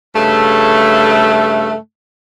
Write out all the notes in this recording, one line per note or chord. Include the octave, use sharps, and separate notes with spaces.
G2 C#3 A3